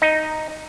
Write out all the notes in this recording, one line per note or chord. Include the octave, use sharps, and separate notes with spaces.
D#4